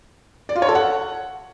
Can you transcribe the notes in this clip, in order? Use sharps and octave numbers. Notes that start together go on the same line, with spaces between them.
D5
F4
C#5
A4
F#5